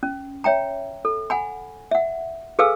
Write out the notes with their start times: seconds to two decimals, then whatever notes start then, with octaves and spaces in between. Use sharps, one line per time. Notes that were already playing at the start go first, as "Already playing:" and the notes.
0.03 C#4
0.44 C#5 E5 G5 A#5
1.05 A4
1.30 F#5 G#5 B5
1.91 E5 F#5
2.59 G#4 A4 B4 F5 G#5 E6